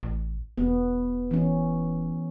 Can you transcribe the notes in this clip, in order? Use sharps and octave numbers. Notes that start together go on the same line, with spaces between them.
A1
E1 B3
E3 C#4